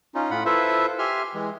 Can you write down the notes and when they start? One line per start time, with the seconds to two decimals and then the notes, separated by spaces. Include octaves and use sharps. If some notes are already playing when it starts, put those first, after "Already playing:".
0.15 C#4 D#4 F4
0.31 A2 F4 F#5 B5
0.45 E4 F4 A4 B4 C5 E5
0.99 G4 E5 G#5 C6 F6
1.34 E3 G#3